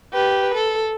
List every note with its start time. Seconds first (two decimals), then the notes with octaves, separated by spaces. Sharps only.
0.13 G4 B4
0.54 A4